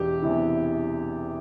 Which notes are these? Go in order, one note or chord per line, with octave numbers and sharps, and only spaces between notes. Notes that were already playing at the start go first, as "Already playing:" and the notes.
Already playing: E1 G4
E2 C3 E3